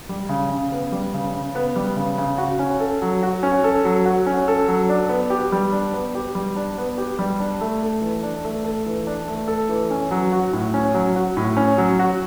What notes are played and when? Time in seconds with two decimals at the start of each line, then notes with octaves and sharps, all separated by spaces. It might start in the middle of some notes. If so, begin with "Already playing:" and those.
0.09 G3
0.29 C#3
0.50 C#3
0.72 B3
0.92 G3
1.14 C#3
1.34 C#3
1.55 B3
1.76 G3
1.96 C#3
2.18 C#3
2.38 F#4
2.59 C#4
2.80 A4
3.02 F#3
3.23 F#4
3.43 C#4
3.64 A4
3.85 F#3
4.05 F#4
4.27 C#4
4.48 A4
4.68 F#3
4.89 D4
5.09 B3
5.30 G4
5.52 G3
5.73 D4
5.93 B3
6.15 G4
6.35 G3
6.56 D4
6.78 B3
6.98 G4
7.19 G3
7.40 D4
7.61 A3
7.82 A4
8.02 E3
8.23 D4
8.45 A3
8.65 A4
8.86 E3
9.07 D4
9.28 A3
9.48 A4
9.69 E3
9.91 C#4
10.11 F#3
10.32 F#4
10.53 A2
10.74 C#4
10.94 F#3
11.16 F#4
11.37 A2
11.57 C#4
11.78 F#3
11.99 F#4